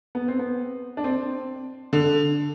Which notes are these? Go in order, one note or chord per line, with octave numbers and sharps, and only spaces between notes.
B3
C4
B3
D4
C4
D3